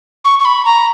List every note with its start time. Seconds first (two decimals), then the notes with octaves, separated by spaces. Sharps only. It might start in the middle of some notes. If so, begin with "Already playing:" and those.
0.25 C#6
0.39 C#6
0.45 B5
0.65 A#5